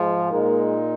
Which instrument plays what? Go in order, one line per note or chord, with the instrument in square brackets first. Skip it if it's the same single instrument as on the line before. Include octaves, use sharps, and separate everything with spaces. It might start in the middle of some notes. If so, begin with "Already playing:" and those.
Already playing: [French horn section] G#2 F3 G#3
A#2 G#3 A#3 D#4 A#4